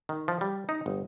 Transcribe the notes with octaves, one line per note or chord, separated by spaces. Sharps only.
D#3
F3
G3
D#4
G1